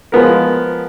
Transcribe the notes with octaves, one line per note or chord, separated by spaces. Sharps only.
F3 G#3 B3 A#4